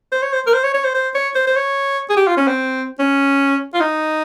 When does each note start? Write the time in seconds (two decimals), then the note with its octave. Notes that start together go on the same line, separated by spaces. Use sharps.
0.12 C5
0.22 C#5
0.32 C5
0.47 A#4
0.53 C5
0.63 C#5
0.74 C#5
0.84 C5
0.94 C5
1.15 C#5
1.35 C5
1.47 C5
1.56 C#5
2.10 G#4
2.17 G4
2.27 F4
2.37 C#4
2.47 C4
2.99 C#4
3.74 F4
3.80 D#4